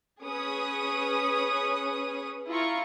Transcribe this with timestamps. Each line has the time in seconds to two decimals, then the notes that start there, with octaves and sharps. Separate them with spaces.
0.23 C#4 G#4 B4 C#5 D#6
2.48 E4 F4 A#5 C#6